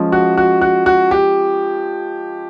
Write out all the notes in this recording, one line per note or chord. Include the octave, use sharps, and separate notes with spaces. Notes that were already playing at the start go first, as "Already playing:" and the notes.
Already playing: F3 G#3 C#4
F#4
F#4
F#4
F#4
G4